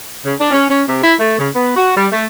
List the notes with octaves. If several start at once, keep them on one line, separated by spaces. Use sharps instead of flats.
C#3
D4
C#4
C#4
C3
E4
A3
C#3
B3
F#4
G3
A3